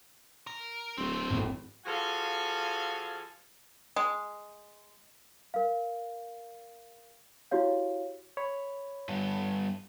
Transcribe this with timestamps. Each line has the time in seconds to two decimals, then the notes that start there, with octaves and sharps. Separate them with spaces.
0.47 A#4
0.98 D1 A3 C4
1.30 G#1 F2 A2
1.86 F3 F#4 G#4 A4 F5 G#5
3.96 G#3
5.54 A#4 F5
7.51 E4 F#4 G4 C#5 F5
8.37 C#5 B5
9.09 G2 B3